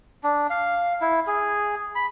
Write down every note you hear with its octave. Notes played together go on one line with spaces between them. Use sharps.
D4
F5
E4
G#4
B5